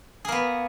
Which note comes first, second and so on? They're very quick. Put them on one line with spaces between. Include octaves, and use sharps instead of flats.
G#4 A#3 B3